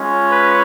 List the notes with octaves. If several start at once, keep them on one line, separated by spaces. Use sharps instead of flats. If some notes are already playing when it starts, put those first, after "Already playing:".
Already playing: G#3 C#4 F4
B4